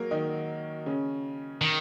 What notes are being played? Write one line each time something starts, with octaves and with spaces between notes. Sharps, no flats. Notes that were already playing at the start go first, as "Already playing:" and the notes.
Already playing: F#3 G#3 A#3 F#4 A#4
D#3 D#4
C#3 C#4
D#3